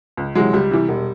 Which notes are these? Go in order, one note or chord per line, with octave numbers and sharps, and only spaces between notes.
C#2
C3 E3 F#3 G#3
C#2 G3
C3 E3
E1